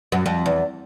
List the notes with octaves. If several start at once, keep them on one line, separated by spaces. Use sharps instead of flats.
F#2
F2
E2